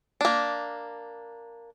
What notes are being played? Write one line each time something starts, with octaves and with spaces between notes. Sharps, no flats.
A#3 D4